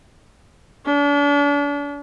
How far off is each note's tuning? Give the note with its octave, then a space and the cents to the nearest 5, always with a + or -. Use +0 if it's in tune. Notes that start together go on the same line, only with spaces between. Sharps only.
D4 -40